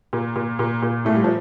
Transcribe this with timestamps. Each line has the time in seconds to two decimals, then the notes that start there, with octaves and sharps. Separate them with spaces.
0.13 A#2
0.36 A#2
0.59 A#2
0.82 A#2
1.05 A2 A3
1.15 G3
1.24 F3